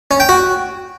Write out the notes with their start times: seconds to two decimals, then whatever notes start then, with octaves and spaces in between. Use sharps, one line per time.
0.11 C#4
0.20 G5
0.29 F#4